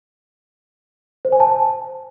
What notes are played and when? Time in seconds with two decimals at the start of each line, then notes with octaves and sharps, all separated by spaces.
1.25 C5
1.32 G#5
1.40 A5